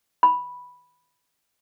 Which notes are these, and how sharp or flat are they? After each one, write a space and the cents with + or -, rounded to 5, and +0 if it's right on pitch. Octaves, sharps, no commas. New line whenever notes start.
B5 -5